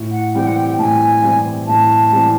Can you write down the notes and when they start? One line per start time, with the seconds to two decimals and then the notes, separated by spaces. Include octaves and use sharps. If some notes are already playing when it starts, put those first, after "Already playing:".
Already playing: A2
0.12 F#5
0.34 E3 G3 C4 G5
0.46 F#5
0.56 G5
0.78 A2 A5
0.82 G#5
1.22 E3 G3 C4
1.67 A2 A5
2.12 E3 G3 C4